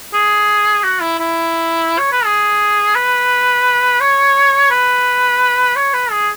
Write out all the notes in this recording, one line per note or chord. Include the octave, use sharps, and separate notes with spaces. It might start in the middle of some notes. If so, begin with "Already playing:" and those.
G#4
F#4
E4
E4
C#5
B4
G#4
B4
C#5
B4
C#5
B4
G#4